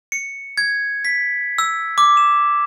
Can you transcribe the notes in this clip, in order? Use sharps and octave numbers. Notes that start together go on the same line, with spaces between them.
C#7
G#6
B6
E6
D6
E7